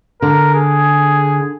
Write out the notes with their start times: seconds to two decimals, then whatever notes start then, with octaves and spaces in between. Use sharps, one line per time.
0.22 D3 A#4
0.54 G#4